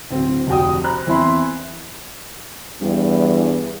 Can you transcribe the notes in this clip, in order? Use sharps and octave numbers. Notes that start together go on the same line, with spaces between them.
D1 C4
F1 D2 F#4 G5 D#6
C5 A#5 B5 F#6
E2 C4 E4 B5 C6
E2 G2